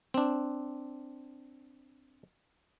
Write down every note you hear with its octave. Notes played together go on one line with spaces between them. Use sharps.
C4 D4